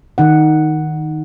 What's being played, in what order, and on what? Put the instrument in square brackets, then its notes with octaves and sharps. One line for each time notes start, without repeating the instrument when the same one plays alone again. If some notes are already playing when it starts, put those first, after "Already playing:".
[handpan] D#3 D#4 F#5